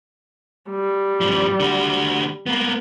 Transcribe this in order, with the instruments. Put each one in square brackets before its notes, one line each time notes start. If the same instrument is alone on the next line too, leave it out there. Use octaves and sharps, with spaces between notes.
[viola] G3
[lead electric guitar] G2 F3
D3 F#4
A#3 B3